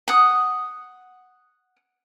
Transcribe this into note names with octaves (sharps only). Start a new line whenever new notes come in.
F#5 D#6